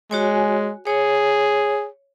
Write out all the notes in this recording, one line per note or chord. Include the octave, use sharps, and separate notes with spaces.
G#3 F#4 C#5 G#5
G#4 C#5